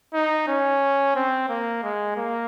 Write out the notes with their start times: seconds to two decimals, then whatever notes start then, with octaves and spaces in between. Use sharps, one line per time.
0.14 D#4
0.47 C#4
1.15 C4
1.49 A#3
1.83 G#3
2.17 A#3